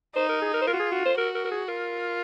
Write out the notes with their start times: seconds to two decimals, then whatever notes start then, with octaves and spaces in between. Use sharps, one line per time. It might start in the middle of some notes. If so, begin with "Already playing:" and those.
0.16 D#4 C5
0.29 A#4
0.42 G#4
0.54 A#4
0.62 C5
0.67 F4 A#4
0.73 F#4
0.79 G#4
0.92 F#4
1.05 C5
1.17 F#4 A#4
1.35 A#4
1.45 A#4
1.51 G#4
1.68 F4 A#4